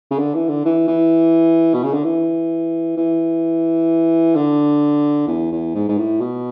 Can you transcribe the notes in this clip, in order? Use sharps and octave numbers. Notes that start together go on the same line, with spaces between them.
C#3
D3
E3
D3
E3
E3
B2
C#3
D3
E3
E3
D3
E2
E2
G#2
G#2
A2
B2